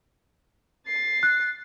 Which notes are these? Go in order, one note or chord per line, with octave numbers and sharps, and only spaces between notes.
A6 C7
F#6